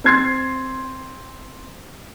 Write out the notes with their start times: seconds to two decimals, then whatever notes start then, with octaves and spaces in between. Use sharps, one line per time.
0.04 C4 C5 C6 G#6 A6 C7